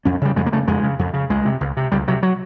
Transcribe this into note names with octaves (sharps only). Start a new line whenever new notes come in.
F2 C#4
C#3 G3
F2 G#3
A#3
C#3 A3
F2 G#3
C#3
F2
C#3
C#2 G#3
C3
C#2
C3
C#2 G3
C3 F#3
F#3